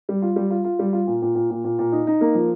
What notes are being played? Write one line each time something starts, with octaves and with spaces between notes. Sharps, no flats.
G3
F4
G3
F4
F4
G3
F4
A#2
A#2
A#2
A#2
A#2
A#2
D#4
D#4
A#3
F3